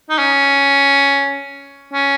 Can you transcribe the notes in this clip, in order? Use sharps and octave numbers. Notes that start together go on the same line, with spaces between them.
D#4
C#4
C#4